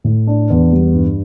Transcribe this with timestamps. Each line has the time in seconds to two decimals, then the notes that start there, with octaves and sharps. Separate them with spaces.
0.04 A2
0.27 D4
0.50 E2
0.73 G3
0.94 G2